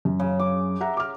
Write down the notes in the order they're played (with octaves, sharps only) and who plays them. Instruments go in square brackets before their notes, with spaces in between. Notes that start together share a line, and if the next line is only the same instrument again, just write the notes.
[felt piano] F#2
[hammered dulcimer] C#3
D6
[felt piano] E5 F#5 A#5
D6 F6